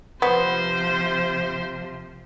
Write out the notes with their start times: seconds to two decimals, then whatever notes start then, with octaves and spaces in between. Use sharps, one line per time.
0.22 C3 F3 B3 C5